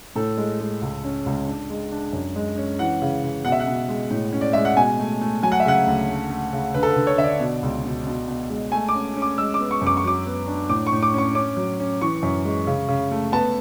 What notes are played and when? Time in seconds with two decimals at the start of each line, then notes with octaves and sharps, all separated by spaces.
0.15 A2 A4
0.37 G#3
0.60 G#3
0.82 C#2
1.04 C#4
1.26 C#2
1.47 D4
1.70 G#3
1.91 D4
2.13 F#2
2.36 G#3
2.58 C#4
2.79 E3 F#5
3.02 C#3
3.24 C#3
3.45 B2 F#5
3.52 E5
3.60 F#5
3.67 B2
3.89 G#3
4.10 A2
4.33 C#4
4.41 D5
4.53 G#3 E5
4.65 F#5
4.77 B2 G#5
4.99 A3
5.21 A3
5.43 F#3 G#5
5.52 F#5
5.60 E5
5.65 C#3 F#5
5.87 D2
6.09 A3
6.30 A3
6.53 C#3
6.74 D3 B4
6.83 A4
6.90 B4
6.96 D3
7.07 C#5
7.18 D3 E5
7.24 D5
7.40 B2
7.63 C#2
7.85 B2
8.07 B2
8.28 B2
8.50 G#3
8.72 A3 G#5
8.89 D6
8.94 C#4
9.16 C#4
9.22 D6
9.38 G#3 E6
9.54 D6
9.60 B3
9.71 C#6
9.81 F#2
9.87 D6
9.97 C#6
10.04 F#3 D6
10.26 B3
10.47 D4
10.69 A2 D6
10.87 C#6
10.92 A2
11.03 D6
11.14 C#4 C#6
11.35 C#4 D6
11.57 F#3
11.80 C#4
12.01 E3 C#6
12.23 F#2
12.44 G#3
12.67 C#3
12.88 C#3
13.11 A3
13.32 B3 A5